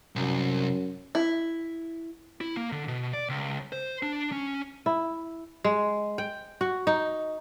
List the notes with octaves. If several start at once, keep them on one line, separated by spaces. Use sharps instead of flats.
C2 F#2
E4
E4
A#3
D3
B2
D5
C#2
C5
D4
C#4
E4
G#3
G5
F#4
D#4